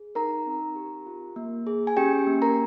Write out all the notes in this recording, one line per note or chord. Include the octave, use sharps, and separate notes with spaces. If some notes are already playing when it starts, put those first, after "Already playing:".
Already playing: G#4
D#4 A#4 A#5
C4
G4
F4
A#3
G#4
G#5
C#4 G4 G5
A#3
A#4 A#5